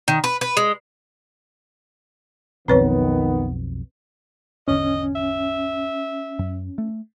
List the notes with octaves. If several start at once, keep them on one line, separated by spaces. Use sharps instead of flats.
D#3
B4
B4
G#3
B1 F2 D#3 B3 C4 B4 C#5
G#1 E2 D3 C#4 D#5
E5
F#2
A3